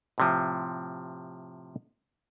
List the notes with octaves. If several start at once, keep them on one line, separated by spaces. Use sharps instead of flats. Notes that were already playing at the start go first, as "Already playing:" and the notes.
A2 C3 F3